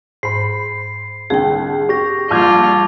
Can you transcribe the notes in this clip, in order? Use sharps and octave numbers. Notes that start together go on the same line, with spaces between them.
G#2 C5 B5 C7
C2 D3 G#4 G5
G4 C#6 A#6
A#1 G3 F4 A5 D6 F6 G6 G#6